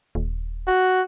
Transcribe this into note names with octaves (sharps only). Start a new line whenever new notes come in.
D#1
F#4